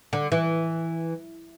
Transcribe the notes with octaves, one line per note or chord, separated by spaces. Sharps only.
D3
E3